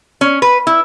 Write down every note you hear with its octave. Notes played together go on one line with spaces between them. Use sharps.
C#4
B4
E4